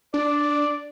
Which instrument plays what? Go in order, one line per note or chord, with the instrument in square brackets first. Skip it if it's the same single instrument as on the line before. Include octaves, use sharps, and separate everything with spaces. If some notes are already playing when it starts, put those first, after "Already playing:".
[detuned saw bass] D4 [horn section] D5